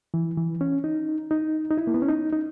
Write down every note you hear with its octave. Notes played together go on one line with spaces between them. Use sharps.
E3
E3
C#4
D#4
D#4
D#4
E4
A#3
B3
C#4
D#4
D#4